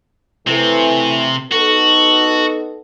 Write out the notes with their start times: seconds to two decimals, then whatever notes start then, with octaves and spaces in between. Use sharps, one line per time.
0.47 C3 E3 A3 C4
1.52 B3 D#4 F#4 A4